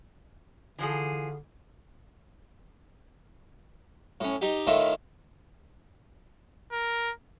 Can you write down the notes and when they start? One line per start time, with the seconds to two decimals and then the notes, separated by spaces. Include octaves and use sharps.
0.78 D3 E3 F3 G#4
4.21 A2 C#4
4.41 D#4 G4
4.67 A2 D#3 E4 F4
6.72 A#4